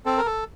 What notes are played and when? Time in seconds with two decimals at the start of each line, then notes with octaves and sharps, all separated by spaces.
0.06 C4 A4
0.18 A#4
0.26 A4